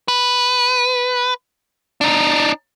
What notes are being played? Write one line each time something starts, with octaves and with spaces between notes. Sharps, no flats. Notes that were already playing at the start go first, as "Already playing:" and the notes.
B4
D4 D#4